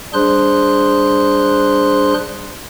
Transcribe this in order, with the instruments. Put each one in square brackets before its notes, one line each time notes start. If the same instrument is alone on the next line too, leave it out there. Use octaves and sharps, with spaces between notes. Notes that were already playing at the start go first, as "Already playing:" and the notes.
[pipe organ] G3 D4 G#4 C5 C6 F#6